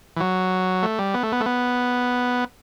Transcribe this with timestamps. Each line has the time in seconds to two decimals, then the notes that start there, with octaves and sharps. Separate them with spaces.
0.16 E3
0.20 F#3
0.83 A3
0.99 G3
1.14 B3
1.23 A3
1.32 B3
1.41 A3
1.46 B3